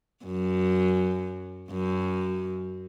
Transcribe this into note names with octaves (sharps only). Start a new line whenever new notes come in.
F#2
F#2